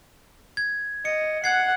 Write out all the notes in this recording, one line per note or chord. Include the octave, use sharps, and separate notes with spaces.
G#6
D#5 C#7
F#5 F#6 G#6 C7